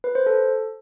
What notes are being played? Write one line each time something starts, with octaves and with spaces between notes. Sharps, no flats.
B4
C5
A4